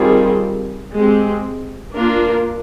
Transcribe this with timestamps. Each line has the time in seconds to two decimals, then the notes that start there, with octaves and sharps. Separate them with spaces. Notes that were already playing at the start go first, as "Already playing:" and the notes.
Already playing: D#3 G3 C4 F4 G#4
0.94 G#3 C4 G4
1.95 A#3 D4 F4 A#4